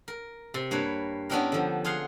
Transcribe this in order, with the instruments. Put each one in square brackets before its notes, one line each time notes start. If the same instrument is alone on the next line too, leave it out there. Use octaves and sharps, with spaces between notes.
[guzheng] A#4
C3
G2 A#3 B4 C#5
B3 C#4 D4 E4 G4 A#4
D3 F3
F4 G#4 F5 F#5